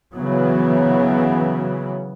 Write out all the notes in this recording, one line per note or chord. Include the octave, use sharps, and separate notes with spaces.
C#3 E3 F#3 B3